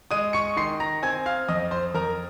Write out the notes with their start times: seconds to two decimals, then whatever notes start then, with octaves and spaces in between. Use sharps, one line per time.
0.11 G#3 D#6 D#7
0.33 C#6 C#7
0.57 D#3 C6 C7
0.80 A#5 A#6
1.02 C4 G#5 G#6
1.26 F5 F6
1.48 F2 D#5 D#6
1.71 C5 C6
1.94 F2 A#4 A#5